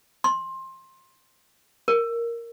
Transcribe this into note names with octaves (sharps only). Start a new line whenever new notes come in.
C6
A#4